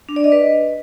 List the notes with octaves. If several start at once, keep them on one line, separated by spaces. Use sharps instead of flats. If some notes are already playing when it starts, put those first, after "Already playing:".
D4
D5
D#5
B4